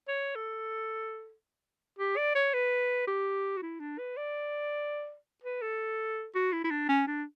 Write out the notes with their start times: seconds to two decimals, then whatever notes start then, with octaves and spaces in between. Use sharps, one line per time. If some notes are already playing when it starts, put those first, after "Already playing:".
0.08 C#5
0.35 A4
1.98 G4
2.17 D5
2.35 C#5
2.53 B4
3.07 G4
3.57 F#4
3.62 E4
3.80 D4
3.98 B4
4.17 D5
5.44 B4
5.62 A4
6.35 F#4
6.53 E4
6.64 E4
6.71 D4
6.89 C#4
7.07 D4